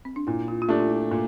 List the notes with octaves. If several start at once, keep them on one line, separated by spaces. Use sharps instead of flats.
C4
D4
A#2 E4
F4
F4
A3 D4 G4
F4
E4
A#2